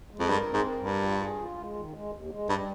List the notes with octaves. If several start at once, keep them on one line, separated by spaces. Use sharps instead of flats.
G#3
F2
G2 A#4
C4
G#2
A#4
G2
G3
F4
G#4
F4
G#3
D#3
G#3
D#2
G#3
G2 G3